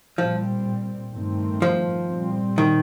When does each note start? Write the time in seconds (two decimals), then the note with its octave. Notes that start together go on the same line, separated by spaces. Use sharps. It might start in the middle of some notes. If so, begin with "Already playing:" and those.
0.18 A#2 F3 G3 C4
1.14 G2 D#3 A3 C4
1.62 F3
2.10 A#2 G3 C4
2.58 D#3